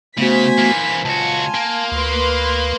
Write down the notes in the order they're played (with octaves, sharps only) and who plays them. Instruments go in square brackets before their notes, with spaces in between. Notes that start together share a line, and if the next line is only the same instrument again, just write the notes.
[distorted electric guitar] C#3 [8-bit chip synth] A3 B3 F#4 [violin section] C5 G#5 B6
[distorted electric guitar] E3 A#3
[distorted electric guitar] C#2 F#4 [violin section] F4 G#5 [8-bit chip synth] A5
[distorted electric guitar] A#3
[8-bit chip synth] D2 [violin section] B4 C6